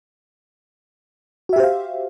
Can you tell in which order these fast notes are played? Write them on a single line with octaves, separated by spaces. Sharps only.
F#4 E5 G4 C5 F5